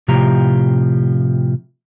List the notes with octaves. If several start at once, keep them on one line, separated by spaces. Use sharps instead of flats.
A2 C3 F3 G4 A#5